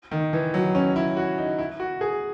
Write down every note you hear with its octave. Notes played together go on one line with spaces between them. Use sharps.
D#3
E3
F#3
C#4
E4
F#4
D#4
E4
F#4
G#4